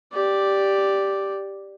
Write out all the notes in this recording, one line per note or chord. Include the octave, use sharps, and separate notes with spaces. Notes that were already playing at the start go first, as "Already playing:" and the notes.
G4 D5